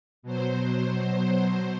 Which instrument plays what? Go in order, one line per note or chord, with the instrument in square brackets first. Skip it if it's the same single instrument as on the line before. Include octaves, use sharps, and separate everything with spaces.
[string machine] B2 F#3 C5